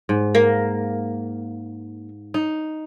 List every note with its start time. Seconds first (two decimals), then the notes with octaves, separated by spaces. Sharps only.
0.09 G#2
0.35 A#3
2.34 D#4